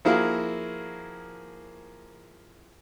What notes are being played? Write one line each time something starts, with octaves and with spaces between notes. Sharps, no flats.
F3 A#3 E4 F#4 G#4 A#4